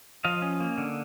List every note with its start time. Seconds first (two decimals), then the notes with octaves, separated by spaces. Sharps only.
0.24 F3 D#5 F5
0.42 C#4
0.60 A#3
0.78 D3